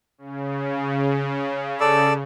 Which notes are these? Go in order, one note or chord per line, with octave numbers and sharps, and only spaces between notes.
C#3
A4 D5 E6